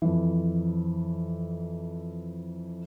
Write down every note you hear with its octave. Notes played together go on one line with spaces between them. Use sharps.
F2 E3